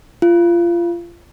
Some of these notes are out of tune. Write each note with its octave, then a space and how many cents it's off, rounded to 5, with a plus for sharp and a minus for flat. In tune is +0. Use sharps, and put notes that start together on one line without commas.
F4 -25